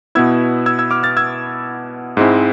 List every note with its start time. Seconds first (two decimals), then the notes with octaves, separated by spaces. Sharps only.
0.15 B2 B3 E4 E6 G#6
0.66 E6 G#6
0.79 E6 G#6
0.91 D6 F6
1.03 F6 A6
1.17 E6 G#6
2.17 G#2 G#3 C4 E4